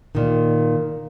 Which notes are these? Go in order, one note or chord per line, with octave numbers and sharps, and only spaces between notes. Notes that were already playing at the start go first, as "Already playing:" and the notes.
A#2 D#3